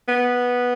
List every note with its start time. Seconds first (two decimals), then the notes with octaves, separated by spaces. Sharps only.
0.08 B3